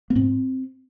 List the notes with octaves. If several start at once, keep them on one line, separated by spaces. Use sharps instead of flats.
B3
G#2 C4